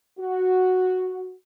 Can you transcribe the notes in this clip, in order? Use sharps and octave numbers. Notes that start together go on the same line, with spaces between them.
F#4